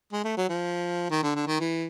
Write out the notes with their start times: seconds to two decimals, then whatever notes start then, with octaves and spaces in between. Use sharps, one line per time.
0.13 G#3
0.24 A3
0.37 F#3
0.49 F3
1.10 D#3
1.23 D3
1.35 D3
1.47 D#3
1.60 E3